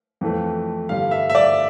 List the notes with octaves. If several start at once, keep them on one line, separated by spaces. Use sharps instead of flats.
F2 E3 A3
G2 D3 G3 F5
E5
E5
D5